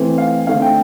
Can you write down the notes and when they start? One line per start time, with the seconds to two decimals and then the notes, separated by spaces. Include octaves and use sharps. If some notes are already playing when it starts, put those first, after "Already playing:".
Already playing: E3 A3 C4
0.18 F5
0.47 D3 A3 C4 F5
0.62 G5